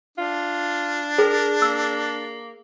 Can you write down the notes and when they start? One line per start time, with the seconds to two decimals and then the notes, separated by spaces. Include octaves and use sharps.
0.18 D4 F4
1.18 G#4 A#4
1.62 A#3 E6